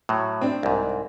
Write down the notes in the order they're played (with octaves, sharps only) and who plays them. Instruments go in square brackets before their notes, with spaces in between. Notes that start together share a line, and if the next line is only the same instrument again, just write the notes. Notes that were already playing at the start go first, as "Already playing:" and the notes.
[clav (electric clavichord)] A2 F#3
[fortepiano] C4 D4
[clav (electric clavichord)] C2 G#2